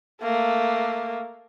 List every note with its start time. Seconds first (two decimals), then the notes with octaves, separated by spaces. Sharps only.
0.22 A3 A#3